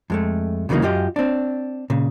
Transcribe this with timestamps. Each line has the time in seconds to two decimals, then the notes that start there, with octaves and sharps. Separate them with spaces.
0.10 F2 G#3 A3
0.69 D2 C#3 E3 F#3 A#3 D#4
0.82 F#2 F4 G4 D#5
1.16 C4 D4
1.90 A#2 C#3